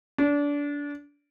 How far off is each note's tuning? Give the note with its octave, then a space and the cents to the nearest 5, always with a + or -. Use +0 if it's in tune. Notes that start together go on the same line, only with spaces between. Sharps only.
D4 -25